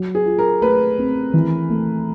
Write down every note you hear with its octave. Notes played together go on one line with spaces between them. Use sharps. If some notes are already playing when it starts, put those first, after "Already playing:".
Already playing: F#3
G#4
F4
A#4
A3 B4
C4
E3
A3